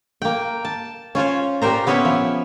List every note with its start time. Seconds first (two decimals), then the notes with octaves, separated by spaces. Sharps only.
0.22 A#3 G5
0.65 A5
1.15 C#4 F4 C5 C#5
1.62 A#2 G4 A#4 C5 A#5
1.87 B3 C#4 E4 C#5 E5
2.05 F3